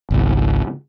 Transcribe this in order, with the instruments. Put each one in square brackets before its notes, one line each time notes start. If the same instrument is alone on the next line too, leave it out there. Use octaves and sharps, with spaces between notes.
[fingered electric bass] G#1 C#2